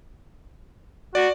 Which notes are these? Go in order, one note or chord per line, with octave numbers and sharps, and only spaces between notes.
F#4 D5